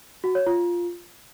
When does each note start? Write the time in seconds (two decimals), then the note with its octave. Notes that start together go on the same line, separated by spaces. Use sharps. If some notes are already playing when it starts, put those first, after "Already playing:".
0.24 F#4
0.35 C#5
0.46 F4